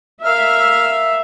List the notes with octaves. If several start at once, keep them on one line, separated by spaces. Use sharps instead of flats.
A#4 E5 F5 F6